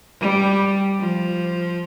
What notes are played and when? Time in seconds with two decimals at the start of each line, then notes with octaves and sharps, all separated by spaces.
0.20 G3
1.00 F3